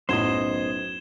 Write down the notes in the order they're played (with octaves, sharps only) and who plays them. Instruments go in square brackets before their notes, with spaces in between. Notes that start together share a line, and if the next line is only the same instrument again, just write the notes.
[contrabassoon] B1 [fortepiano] F#2 A2 [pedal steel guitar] C5 D#5 [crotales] G#6 E7 G7